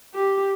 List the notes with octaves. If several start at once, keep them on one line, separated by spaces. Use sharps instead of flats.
G4